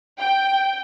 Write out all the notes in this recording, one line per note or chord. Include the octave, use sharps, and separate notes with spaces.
G5